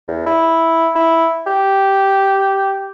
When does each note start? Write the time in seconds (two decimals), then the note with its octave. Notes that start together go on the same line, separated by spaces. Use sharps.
0.08 E2
0.26 E4
0.95 E4
1.46 G4